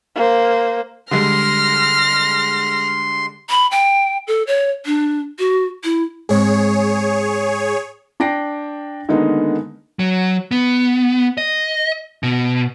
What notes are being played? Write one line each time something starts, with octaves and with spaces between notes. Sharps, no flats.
A#3 C5
D3 G3 G#3 C6 F6 A#6
B5
G5
A4
C#5
D4
F#4
E4
G#2 G#3 C4 G#4 C#5
D4 G5 A#6 C7 D7
D3 D#3 G#3 A#3 B3 D#4
F#3
B3
D#5
B2